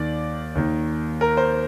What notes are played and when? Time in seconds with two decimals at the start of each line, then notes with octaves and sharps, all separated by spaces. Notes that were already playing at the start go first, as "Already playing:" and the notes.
Already playing: D#2 D#3 D5
0.55 D#2 D#3
1.21 A#4
1.37 C5